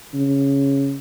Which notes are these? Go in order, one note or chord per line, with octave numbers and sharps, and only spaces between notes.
C#3